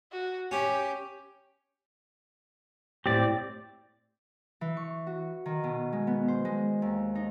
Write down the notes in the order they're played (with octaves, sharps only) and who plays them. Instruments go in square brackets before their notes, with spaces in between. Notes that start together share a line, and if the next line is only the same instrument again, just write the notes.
[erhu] F#4
[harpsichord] C#4 [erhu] G4
[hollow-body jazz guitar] A2 G4 [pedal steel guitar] C4 D5
[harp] E3
C#6
F#4
D#3
B2
G#3
B3
C5
G#3
D#2
D#4